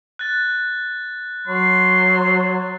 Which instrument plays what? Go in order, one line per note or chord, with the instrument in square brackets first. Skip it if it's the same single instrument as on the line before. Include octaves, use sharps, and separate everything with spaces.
[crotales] F#6 A6
[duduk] F#3 [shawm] C6